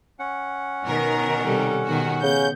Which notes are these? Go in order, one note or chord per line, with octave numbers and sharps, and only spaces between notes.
C#4 F#5
B2 D#3 A#4
C3 G3 A4
B2 D#3 F#4
C#3 B3 G6